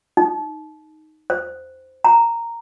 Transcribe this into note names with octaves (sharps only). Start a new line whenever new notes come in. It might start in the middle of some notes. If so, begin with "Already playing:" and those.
D#4
C5
A#5